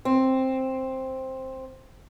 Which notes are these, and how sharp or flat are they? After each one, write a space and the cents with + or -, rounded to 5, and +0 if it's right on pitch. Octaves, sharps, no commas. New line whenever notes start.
C4 +5